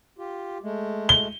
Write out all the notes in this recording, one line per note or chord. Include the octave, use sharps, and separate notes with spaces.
F4 G4
G#3 A3
G7